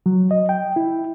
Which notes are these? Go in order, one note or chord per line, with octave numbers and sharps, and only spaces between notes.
F#3
D#5
G5
E4